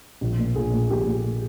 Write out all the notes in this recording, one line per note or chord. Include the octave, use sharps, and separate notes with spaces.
A#1
A#2
A#1 G#4
A#2
A#1 G4
A#2